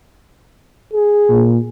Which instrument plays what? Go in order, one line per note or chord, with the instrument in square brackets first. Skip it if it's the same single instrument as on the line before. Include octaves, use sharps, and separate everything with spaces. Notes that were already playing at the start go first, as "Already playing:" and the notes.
[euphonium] G#4
[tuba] A#2